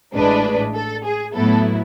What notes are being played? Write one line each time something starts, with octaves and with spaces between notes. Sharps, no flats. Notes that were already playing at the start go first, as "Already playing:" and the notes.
A1 A2 G#3 D4 B4
A4
G#4
A2 F#3 B3 E4 A4